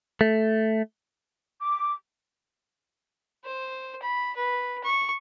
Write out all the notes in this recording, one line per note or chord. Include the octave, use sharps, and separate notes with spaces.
A3
D6
C5
B5
B4
C#6